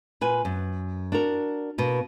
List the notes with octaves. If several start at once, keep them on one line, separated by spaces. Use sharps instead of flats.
A#2 B4 G#5
F#2
D4 F#4 A#4
B2 A#3